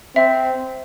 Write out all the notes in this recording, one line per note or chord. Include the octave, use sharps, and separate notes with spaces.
C4 E5